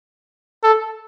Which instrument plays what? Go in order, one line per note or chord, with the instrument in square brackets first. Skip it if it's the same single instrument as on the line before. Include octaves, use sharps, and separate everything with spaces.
[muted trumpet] A4